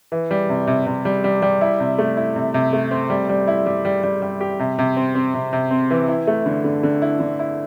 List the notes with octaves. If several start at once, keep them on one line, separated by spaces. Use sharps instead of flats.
E3
G3
C3
C3
C3
G3
G3
G3
E4
C3
A3
E4
C3
C3
A3
C4
G3
G3
E4
G3
G3
G3
G3
G4
C3
C3
C4
C4
C3
C3
C4
E3
E4
A3
D3
D3
D3
E4
D3
E4